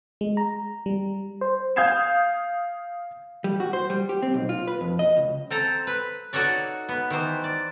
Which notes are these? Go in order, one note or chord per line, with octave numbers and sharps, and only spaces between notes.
G#3
A#5
G3
C5
F5 D#6 G6 G#6 C7 E7
G3
F#4
C5
G3
G4
C4
B1
F4
B4
F2
D#5
C#2
C4 A4 A#5
B4
D#4 F#4 A4 C#5 D5
B3
D#3 E3 C5
D5